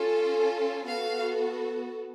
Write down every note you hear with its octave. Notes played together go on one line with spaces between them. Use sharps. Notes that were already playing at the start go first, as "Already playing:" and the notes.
Already playing: C#4 F4 A4
B3 F#4 A4 F5